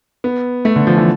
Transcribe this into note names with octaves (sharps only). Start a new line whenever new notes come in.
B3
A3
D3
F3
E3